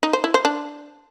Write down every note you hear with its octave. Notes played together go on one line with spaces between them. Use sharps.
D#4
C5
E4
C5
D4